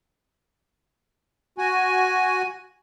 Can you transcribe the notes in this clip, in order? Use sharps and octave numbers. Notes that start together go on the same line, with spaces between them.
F#4 G#5